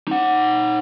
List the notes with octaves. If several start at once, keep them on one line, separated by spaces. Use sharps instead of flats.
D#4 F#5